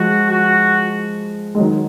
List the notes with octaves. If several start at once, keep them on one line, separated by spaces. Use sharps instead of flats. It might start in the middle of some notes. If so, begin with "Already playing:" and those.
Already playing: F3 G#3 F#4
F#4
G#3
D#3 F#3